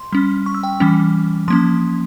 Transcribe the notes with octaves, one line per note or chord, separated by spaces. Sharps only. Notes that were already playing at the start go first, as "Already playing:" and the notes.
Already playing: C6
G3 C#4
C#6
E6
G5
E3 G3 C#4
F3 A#3 C#4 C6